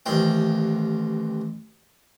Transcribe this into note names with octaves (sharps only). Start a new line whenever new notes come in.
A1 D#2 C4 G5